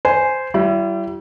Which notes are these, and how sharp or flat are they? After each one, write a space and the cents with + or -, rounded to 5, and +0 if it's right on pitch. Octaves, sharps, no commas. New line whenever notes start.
C5 -10 G#5 +0
G3 -35 E4 +30